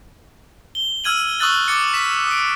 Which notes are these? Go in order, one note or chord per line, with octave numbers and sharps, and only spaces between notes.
G7
E6 F6 G#6 D#7 F#7
C#6 D#6 E6 F#6 A6 F#7
D6 A6 C#7
B6 E7
D#6 D7